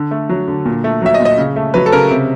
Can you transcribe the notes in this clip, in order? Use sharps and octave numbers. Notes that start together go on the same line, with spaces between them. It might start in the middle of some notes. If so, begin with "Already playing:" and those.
Already playing: D3
A3
F#3
D3
A#2
A3
F#3 E5
D#5
A#2
D#5
C#3
A3
F#3 B4
A4
C#3 A#4
C3